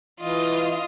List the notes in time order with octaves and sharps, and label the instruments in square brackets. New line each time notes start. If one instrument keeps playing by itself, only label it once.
[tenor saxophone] E3 [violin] F4 D#5